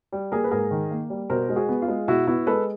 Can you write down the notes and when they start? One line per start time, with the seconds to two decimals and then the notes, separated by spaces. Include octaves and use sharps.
0.12 G3
0.32 A#3 G#4 A#4
0.44 B4
0.51 G#2 G#4 A#4
0.71 D#3
0.91 A#3
1.10 G3
1.30 B2 A#4 C5
1.49 G#3
1.56 F#4 G#4
1.69 B3
1.82 F4
1.88 G#3
2.08 B2 E4 F#4
2.27 B3 E4 F#4
2.47 G#3 A4 B4